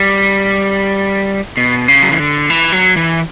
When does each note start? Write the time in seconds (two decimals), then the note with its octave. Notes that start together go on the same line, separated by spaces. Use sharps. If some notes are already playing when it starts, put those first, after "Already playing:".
Already playing: G3
1.57 B2
1.88 C#3
2.02 F#3
2.11 E3
2.20 D3
2.50 E3
2.72 F#3
2.96 E3